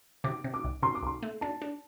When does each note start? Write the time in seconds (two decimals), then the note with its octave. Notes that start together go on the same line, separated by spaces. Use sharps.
0.24 C3 D6
0.44 C3
0.54 D6
0.64 C2
0.83 C3 C6
0.95 D6
1.03 C2 C6
1.23 A3
1.41 D4 A5
1.62 D4